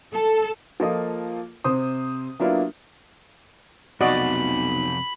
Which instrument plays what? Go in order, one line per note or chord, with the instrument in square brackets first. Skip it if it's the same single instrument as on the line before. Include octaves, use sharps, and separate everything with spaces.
[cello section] A4
[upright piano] F3 A#3 F4 A4 D#5
C3 C5 D#6
F#3 A#3 B3 D4 E4 F4
[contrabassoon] B1 [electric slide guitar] F2 C3 F3 [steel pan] F#4 D5 D#5 [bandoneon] B5